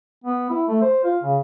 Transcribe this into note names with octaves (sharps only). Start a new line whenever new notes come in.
B3
E4
A3
C5
F4
C#3